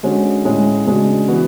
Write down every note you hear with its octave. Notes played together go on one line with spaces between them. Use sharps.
D3 G#3 C#4 F#4
A2 G#3 C#4 E4
C#3 G#3 D4 F#4
E3 B3 F#4